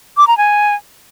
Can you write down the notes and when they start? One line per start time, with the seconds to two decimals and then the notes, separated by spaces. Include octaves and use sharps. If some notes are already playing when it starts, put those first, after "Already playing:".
0.17 D6
0.27 A#5
0.38 G#5